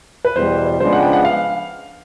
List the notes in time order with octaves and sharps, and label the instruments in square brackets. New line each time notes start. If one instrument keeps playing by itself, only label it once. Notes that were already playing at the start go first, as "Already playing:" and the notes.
[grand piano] B4
[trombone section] E2 B2 G3 [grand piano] C5
[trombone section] C#3 F3 G#3 B3 D4 [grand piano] C5
[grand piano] F#5
G5
F#5
F5